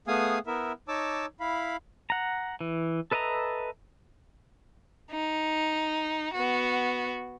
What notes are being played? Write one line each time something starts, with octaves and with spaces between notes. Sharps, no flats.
A3 B3 G#4 F5 G#5 D#6
B3 E4 A#4 E5
D#4 C#5 A5 D6 E6
E4 F5 B5
F#5 A#5
E3
A4 B4 D#5 E5 A#5
D#4
B3 F#4